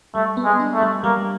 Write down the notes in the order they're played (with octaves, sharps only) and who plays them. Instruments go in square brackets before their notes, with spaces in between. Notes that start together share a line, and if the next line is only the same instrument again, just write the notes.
[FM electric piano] G3 [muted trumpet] A3
[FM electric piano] B3
[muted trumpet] G#3
[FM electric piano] D4
[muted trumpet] A3
[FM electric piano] G3
[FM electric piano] G3 [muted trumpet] A#3